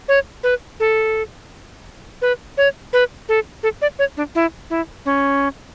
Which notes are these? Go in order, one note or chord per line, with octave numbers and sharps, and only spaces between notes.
C#5
B4
A4
B4
C#5
B4
A4
A4
D5
C#5
D4
E4
E4
C#4